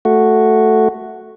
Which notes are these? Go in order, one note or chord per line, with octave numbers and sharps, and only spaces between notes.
A3 F#4